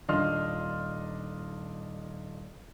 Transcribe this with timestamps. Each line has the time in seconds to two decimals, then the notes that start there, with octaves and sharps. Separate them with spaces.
0.08 D#1 D4 F4 D#5 C6 F6